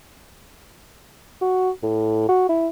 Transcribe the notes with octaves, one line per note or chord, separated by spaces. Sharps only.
F#4
A2
F#4
E4